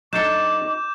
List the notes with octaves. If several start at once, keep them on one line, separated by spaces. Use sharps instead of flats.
F#3 D4 D#4 F#4 A4 D6 G6 E7